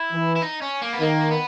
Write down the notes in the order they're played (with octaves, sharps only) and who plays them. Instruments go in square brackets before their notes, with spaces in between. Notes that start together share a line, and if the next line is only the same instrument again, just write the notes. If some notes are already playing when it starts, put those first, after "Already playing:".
Already playing: [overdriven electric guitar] E4
[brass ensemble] E3
[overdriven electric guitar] E4
D#4
C#4
A#3
B3
[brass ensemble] D#3 [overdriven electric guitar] A#3
[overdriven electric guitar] B3